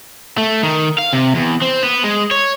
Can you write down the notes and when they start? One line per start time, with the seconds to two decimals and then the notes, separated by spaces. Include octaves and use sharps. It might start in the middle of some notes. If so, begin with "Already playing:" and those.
0.38 A3
0.63 D#3
0.99 F5
1.13 C3
1.35 E2
1.62 C4
1.83 B3
2.04 G#3
2.31 C#5